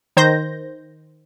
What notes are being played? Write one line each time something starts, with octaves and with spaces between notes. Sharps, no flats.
D#3 C5 G6 A#6